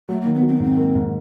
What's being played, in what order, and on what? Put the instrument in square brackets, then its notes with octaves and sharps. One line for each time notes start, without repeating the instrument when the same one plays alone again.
[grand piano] F#3 [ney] A3
[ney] A#3
[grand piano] D#3
[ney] B3
[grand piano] F#3
[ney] C4
B3
[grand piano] G#2 [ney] C4
[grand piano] A#3
G#2